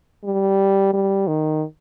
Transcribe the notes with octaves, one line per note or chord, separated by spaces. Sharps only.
G3
G3
D#3